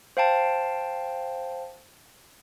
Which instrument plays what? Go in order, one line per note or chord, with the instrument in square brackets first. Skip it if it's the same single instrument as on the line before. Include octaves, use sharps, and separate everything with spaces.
[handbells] C5 F5 G5 A5